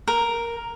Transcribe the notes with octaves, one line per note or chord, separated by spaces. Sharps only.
A#4